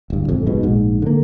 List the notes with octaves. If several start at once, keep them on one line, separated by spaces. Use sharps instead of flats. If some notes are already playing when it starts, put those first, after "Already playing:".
D1 G2
D#1 G#1 F2
F1 G#2 B2
A#1 G#2
D3 A#3